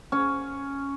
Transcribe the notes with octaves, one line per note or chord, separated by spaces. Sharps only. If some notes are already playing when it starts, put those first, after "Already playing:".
C#4